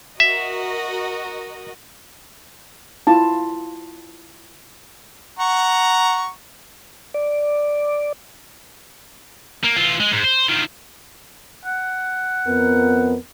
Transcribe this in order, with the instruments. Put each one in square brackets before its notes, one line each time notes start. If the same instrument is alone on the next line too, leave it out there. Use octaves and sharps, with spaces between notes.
[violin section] F#4 A#4 D#5 [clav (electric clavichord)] E5
[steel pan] E4 F4 A5
[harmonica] F#5 A#5 C#6
[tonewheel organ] D5
[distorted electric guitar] A#3
E3 F4
G#3
G#2
C5
D#3 F3
[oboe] F#5
[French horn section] F2 B3 A#4